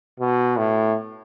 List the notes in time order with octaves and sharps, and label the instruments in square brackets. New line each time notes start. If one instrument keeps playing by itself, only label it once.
[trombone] B2
A2